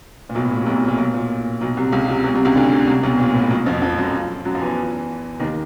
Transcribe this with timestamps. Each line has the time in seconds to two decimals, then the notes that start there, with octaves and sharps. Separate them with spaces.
0.29 A#2
0.35 B1 B2
0.45 A2
0.51 A#2
0.61 C3
0.66 B1 B2
0.77 A#2
0.88 A#2
0.98 B1 B2
1.14 A#2
1.61 B1 B2
1.77 C2 C3
1.92 C#2 C#3
2.08 C2 C3
2.24 B1 B2
2.35 C2 C3
2.45 C#2 C#3
2.56 D2 D3
2.87 C2 C3
3.03 B1 B2
3.19 A#2
3.34 A2
3.50 B1 B2
3.66 F2 F3
3.82 F2 F3
3.98 F#2 F#3
4.45 F#2 F#3
4.55 F3
4.61 E2 E3
5.40 D#2 D#3